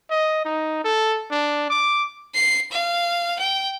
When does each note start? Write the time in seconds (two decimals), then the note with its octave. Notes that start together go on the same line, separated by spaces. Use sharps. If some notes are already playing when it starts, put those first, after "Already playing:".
0.10 D#5
0.45 D#4
0.84 A4
1.31 D4
1.70 D6
2.35 C7
2.72 F5
3.39 G5